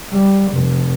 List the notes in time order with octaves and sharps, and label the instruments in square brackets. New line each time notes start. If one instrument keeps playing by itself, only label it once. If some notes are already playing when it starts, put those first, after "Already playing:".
[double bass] G3
F1